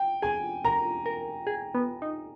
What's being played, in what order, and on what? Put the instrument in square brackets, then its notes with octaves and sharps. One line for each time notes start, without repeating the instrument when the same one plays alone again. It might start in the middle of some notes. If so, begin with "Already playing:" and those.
Already playing: [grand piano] G5
[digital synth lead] G#4 [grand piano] G#5
[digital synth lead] A#4 [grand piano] A#5
[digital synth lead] A#4
G#4
B3
D#4